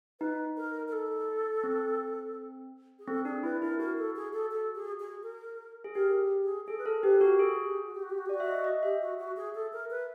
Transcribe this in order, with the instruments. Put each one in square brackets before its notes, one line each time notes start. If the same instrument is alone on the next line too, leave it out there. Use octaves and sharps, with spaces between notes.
[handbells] D#4 [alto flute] B4
[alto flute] A#4
A#4
A4
[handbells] C4
[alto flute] G#4
[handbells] C4 [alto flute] A4
[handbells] D4 [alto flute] G#4
[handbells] E4 [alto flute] B4
[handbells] E4 [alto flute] A#4
[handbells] F#4 [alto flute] A#4
[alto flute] A4
G#4
A4
A4
G#4
G#4
A#4
[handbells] G#4
[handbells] G4 [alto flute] A#4
[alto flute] G#4
[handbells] G#4 [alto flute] A4
[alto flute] B4
[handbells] A4 [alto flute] A#4
[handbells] G4 [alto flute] B4
[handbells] F#4 [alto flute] A#4
[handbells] G#4 [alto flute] A4
[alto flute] G4
F#4
G4
F#4
G4
F#4
G4
[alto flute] F#4 [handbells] D5
[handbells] E5
D#5
D#5
[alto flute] G4 [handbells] E5
[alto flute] F#4
F#4
G#4
A4
A#4
B4